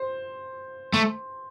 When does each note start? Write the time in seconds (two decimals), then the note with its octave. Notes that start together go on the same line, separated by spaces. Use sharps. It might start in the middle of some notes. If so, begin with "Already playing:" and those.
Already playing: C5
0.94 A3